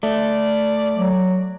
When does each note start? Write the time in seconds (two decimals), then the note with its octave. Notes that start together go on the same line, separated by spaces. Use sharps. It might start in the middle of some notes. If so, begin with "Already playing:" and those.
0.03 A3 D5
0.97 F#3